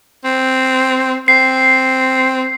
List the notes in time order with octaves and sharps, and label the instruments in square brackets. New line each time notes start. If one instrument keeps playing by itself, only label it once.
[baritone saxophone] C4
[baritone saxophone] C4 [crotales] C7